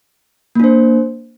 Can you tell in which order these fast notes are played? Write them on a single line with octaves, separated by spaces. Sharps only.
A#3 D4 C5